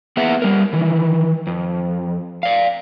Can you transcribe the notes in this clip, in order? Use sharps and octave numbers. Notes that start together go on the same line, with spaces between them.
A#3 B3 G#4 B4 E5 F#5
G3 A#4
D#3 E3
F2
D5 F5